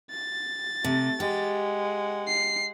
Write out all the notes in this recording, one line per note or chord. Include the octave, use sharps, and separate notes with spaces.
A6
C3 A3
G#3 G4 F#5
C7